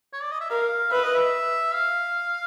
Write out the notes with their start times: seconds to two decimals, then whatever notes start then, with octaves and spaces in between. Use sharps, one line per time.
0.13 C#5
0.22 D5
0.32 D#5
0.41 E5
0.50 A#4 F5
0.91 B4 E5
1.03 D#5
1.14 E5
1.74 F5